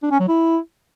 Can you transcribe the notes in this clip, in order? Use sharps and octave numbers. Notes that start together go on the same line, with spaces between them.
D4
C#4
F#3
E4